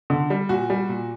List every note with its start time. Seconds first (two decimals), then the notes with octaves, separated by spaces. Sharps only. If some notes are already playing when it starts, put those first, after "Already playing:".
0.10 D3
0.30 G3
0.49 A#2 F#4
0.70 G3
0.89 A#2